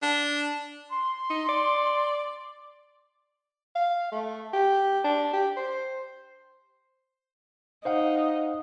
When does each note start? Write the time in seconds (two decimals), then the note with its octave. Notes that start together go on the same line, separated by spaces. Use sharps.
0.02 D4
0.91 C6
1.30 D#4
1.49 D5
3.75 F5
4.12 A3
4.53 G4
5.04 D4
5.33 G4
5.56 C5
7.85 D#4 C5 F5 F#5